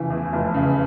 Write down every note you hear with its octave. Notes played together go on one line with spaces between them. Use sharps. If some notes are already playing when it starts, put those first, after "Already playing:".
Already playing: F1 C#3 E3
E2
F1
C#3